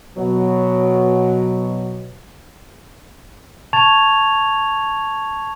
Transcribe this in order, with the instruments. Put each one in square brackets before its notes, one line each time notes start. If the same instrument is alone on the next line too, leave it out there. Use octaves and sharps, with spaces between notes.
[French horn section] B2 F#3
[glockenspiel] A5 C#6 G#6 A6 F7